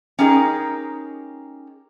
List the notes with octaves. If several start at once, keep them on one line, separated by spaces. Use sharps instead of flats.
C#4 D#4 G4 G#4 A#4